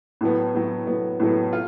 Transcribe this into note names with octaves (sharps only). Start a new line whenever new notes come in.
A2 F#3 B3
A2 F#3 B3
A2 F#3 B3
A2 F#3 B3
F4